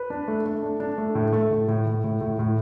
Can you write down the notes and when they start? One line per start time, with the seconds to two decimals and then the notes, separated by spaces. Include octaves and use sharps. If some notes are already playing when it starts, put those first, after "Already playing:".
Already playing: B4
0.10 D4
0.28 A3
0.46 A3
0.62 D4
0.80 D4
0.98 A3
1.15 A2
1.33 A3
1.51 A2
1.68 A2
1.86 A2
2.04 A2
2.21 A2
2.39 A2